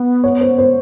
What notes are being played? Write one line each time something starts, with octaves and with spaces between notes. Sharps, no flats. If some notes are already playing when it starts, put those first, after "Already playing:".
Already playing: B3
C#5
C5
C5